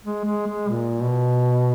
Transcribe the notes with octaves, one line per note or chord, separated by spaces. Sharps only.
G#3
G#3
G#3
A#2
B2